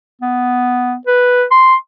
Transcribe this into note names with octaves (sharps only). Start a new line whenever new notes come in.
B3
B4
C6